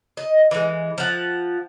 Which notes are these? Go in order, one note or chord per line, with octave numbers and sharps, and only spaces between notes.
D#5
E3 G#3
F3 F#5